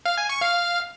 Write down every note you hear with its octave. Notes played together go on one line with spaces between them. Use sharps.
F5
G#5
C#6
F5